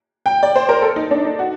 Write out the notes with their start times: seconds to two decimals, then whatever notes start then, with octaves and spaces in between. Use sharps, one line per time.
0.26 G5
0.43 D5
0.56 C5
0.69 A#4
0.82 A4
0.96 D#4
1.11 D4
1.25 D#4
1.39 F#4